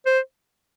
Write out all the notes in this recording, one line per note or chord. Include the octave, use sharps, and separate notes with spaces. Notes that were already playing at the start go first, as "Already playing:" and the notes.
C5